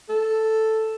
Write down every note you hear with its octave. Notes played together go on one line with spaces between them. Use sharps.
A4